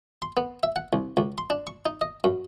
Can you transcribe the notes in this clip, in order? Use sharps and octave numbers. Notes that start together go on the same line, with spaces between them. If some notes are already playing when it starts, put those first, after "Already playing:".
C6
B3
E5
F#5
C2
C#2
C6
D4
C#6
D#4
D#5
F#2